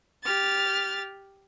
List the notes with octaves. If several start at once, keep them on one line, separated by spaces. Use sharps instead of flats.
G4 F6 A6